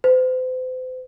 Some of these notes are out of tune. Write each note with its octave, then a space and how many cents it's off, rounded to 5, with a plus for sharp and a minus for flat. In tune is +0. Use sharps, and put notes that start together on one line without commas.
C5 -40